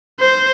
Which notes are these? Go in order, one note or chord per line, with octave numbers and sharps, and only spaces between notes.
C5